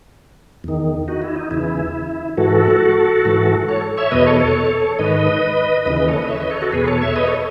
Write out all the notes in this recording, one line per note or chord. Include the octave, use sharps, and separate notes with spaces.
E2 D#3
D#4 F#4
E4
D#4
E2 C#3 E3 E4
G#2 E3 F#4 A4
G#2 E3
A4 C#5
C#5 E5
E2 B2 B4 D#5
A4 C#5
A4 C#5
G#2 D#3 B4 D#5
D#2 C#3 E3 B4 D#5
B4 D#5
A4 C#5
B4 D#5
C#5 E5
B4 D#5
A4 C#5
F#4 A4
E2 B2 G#4 B4
A4 C#5
C#5 E5
B4 D#5
A4 C#5